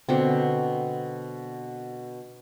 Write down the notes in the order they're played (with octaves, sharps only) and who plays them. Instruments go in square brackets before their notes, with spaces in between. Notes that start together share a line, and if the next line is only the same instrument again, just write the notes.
[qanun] B2 D3 C4